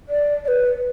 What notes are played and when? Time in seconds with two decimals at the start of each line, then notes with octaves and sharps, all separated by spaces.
0.09 D5
0.45 D5
0.48 B4